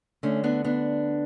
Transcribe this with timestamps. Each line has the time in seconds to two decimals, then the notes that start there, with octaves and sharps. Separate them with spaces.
0.23 D2 D3 A3 C#4
0.44 B3 D4
0.64 B3 D4